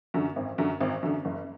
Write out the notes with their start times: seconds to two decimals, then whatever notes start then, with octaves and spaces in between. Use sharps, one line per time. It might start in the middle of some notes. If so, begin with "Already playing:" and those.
0.14 F#2 D3
0.36 G#1
0.58 F#2 D3
0.80 G#1
1.03 F#2 D3
1.25 F#1